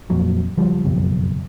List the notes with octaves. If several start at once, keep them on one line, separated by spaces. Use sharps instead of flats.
F2 A#2 F#3
C#2 F3 G3
F#1 B1 F2